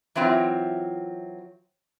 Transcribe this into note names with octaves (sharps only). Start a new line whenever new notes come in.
E3 F#3 C4 F4 E5